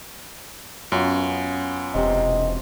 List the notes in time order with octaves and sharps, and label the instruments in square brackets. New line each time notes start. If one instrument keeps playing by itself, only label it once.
[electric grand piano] F#2 [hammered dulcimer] B3 C#4 F4
[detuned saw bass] E1 [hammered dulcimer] C3 C6 [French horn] D#5